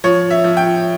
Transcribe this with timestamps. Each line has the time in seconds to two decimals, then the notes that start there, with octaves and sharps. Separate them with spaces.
0.04 F3 C#5
0.31 E5
0.44 F3
0.57 G5